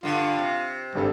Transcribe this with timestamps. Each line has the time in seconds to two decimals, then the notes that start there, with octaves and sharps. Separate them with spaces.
0.03 G2 D3 F4
0.39 C3
0.95 G#1 G2 G3 A4